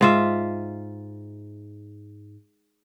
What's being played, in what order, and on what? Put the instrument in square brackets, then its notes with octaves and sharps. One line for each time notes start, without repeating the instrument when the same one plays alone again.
[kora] G#2 F4 E5